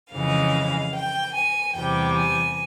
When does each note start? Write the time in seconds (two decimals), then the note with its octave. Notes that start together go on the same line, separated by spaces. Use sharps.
0.13 F2 C#3 E3 G#3 F5
0.95 G5
1.35 G#5
1.76 E2 C3 G3 G5
2.17 G#5